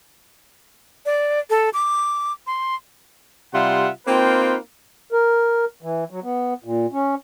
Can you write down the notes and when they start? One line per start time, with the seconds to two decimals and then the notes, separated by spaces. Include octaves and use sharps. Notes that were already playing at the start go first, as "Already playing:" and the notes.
1.06 D5
1.50 A4
1.74 D6
2.47 C6
3.53 C3 G3 F4 E5 F#5 C6
4.07 A#3 C4 D#4 F4 B4 G5
5.12 A#4
5.82 E3
6.11 F#3
6.23 B3
6.64 A#2
6.92 C#4